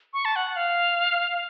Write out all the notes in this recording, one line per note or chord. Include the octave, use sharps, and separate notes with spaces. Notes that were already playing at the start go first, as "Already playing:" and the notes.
C#6
A5
F#5
F5